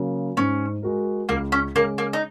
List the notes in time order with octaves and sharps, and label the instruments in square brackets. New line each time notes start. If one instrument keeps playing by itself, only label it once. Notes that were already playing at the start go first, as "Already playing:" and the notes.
Already playing: [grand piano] C#3 F#3 A#3
[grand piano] G#2 [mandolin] C#4
[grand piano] G#3 F#4 A#4
[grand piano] C#2 [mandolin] A#3
[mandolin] C#4
[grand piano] C#3 G#3 C#4 G#4 [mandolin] A#3
[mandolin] A#3
D#4